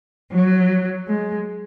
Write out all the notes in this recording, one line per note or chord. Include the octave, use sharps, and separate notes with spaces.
F#3
G#3